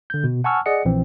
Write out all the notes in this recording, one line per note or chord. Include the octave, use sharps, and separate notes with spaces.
D3 G6
B2
F#5 G#5 A5 C#6 E6 F6
G#4 D5 D#5 F#5 C#7
A#1 E3 C4